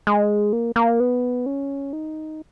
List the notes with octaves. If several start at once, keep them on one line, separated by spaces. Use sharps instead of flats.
G#3
A#3
A#3
B3
C#4
D#4